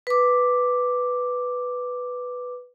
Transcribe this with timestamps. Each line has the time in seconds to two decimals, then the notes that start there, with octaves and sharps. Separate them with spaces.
0.07 B4 D6